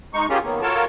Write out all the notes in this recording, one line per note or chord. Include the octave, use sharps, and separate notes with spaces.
G#3 D#4 C#6
A#3 C#4 F4 G4 G#4
D#3 F#3 A#3 B3
F4 F#4 A4 A#4 C#5 A5